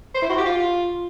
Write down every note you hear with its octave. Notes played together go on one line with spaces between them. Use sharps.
C5
E4
F#4
G4
F4